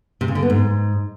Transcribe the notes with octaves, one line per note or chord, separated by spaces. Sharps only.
C3
C#3
D3
B3
G#2